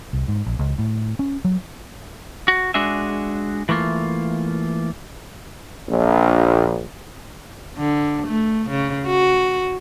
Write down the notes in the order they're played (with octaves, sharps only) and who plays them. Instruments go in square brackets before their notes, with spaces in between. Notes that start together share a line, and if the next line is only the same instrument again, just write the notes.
[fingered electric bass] C2
G#2
A#1
C#2
A2
C#4
F#3
[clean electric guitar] F#4
G#3 D4 F#4 G#4 E5
E3 A3 A#3 F4
[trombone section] A#1
[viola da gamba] D3
A3
C#3
F#4